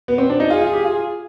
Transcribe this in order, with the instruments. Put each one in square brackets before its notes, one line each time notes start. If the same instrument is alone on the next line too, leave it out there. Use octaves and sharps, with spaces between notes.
[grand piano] B3
C4
D4
D#4
[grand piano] F4 [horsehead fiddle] G#4
[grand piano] F4
G4
F4